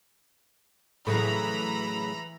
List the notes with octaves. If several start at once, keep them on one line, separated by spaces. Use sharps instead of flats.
A2 C#3 E3 F#3 A#5 B5